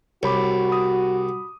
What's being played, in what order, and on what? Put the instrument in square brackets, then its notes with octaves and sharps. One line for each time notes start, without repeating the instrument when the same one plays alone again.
[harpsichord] C2 [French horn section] F#4 [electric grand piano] C#5 B5 D6
[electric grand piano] B5 D#6